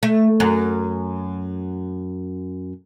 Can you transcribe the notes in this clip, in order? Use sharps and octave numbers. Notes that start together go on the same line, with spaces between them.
A3
F#2